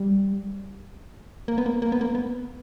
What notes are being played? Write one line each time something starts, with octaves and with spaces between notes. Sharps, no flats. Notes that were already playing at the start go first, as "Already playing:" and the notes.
Already playing: G3
A#3
B3
A#3
A#3
B3
A#3
B3